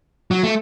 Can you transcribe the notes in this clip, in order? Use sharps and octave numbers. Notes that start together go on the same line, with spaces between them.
F#3
A3